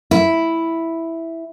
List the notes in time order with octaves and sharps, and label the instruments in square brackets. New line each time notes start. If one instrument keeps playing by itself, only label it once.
[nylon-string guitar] E4